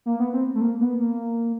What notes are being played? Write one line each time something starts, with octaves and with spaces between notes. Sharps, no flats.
A#3
B3
C4
A3
A#3
B3
A#3